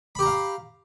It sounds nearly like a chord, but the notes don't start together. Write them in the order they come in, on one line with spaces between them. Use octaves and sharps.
B5 G4 A#5 F5